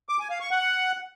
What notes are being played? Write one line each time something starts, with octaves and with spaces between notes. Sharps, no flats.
D6
G#5
F5
C#6
F#5